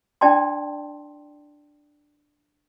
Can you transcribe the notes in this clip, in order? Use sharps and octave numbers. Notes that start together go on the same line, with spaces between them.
D4 E4 D5 G5 A5 C6